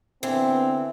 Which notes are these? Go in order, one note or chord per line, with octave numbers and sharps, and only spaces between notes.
D3 E3 B3 C4